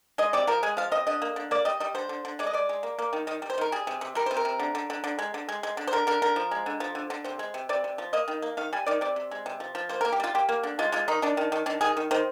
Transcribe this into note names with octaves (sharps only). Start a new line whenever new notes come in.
G#3 D#5
C3 D5
F3 A#4
G#3 G#4
F3 F5
C3 D#5
D3 D#5
A#3
D3
A#3 D5
G3 D#5
G3 D#5
D3 C5
D3
D3
G#3 D5
D#5
G#3 D5
G#3
A#3
A#3
D#3
D#3 D#5
G3
C5
D#3 A#4
G3 G#4
C3
C3
G3 A#4
C3 C5
A#4
C3
D3
D3
D3
D3
G#3
D3
G#3
G#3
D3
C5
D3 A#4
D3 A#4
D3 A#4
F3
G#3
D3
F3
D3
D3
C3 C5
G#3
C3
C3 D5
C3
F3
A#3 D#5
D#3
A#3
D#3 F5
G3 G#5
D#3 D5
C3 D5
C3
G#3
C3
F3
F3
A#3 C5
A#4
A#3
G4
G3 F4
A#3 G4
A#3
D3
G#3 F4
G#3 F4
D#3 D#4
D#3 D4
D#3
D#3
D#3 D4
D#3 G#4
D#3
D#3 C5